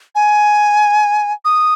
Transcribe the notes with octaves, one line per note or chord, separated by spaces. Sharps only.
G#5
D#6